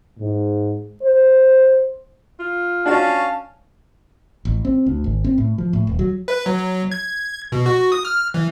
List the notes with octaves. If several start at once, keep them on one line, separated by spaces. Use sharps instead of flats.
G#2
C5
F4
C#4 D4 F#4 F5 A5
A1
C4
D2
G#1
C4
A2
F3
A2
D#1
F#3
B4
F#3
G#6
B2
F#4
D#6
F6
E3